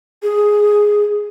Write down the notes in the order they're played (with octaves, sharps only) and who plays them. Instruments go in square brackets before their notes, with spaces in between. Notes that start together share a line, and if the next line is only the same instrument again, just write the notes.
[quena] G#4